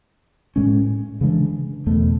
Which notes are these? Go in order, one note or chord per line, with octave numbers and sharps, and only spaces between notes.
A2 G#3 C#4
C#3 E3 G#3 D4
E2 B2 A3